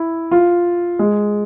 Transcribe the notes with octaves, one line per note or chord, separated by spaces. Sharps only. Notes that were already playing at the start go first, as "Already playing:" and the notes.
Already playing: E4
F4
G#3